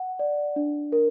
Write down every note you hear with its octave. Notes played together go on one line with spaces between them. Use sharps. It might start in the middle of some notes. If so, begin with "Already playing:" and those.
Already playing: F#5
D5
D4
A#4